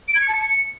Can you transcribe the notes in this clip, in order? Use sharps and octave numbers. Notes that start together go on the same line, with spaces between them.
D7
G#6
C#7
A5
C#7